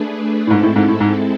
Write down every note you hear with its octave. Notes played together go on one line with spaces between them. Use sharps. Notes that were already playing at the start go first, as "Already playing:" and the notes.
Already playing: A3 D4 G#4 B4
A2
G#2 G#3 C4 E4 A4
A2
G#2
A2
G#2